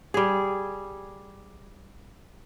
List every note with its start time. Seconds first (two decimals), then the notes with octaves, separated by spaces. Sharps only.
0.14 G3 G#4